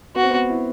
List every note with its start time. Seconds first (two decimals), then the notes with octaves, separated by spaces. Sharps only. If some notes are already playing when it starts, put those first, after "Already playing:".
0.16 B3 F#4
0.23 C4
0.31 B3
0.50 E4